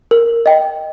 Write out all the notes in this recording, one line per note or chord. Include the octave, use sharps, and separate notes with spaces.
A#4
D#5 G5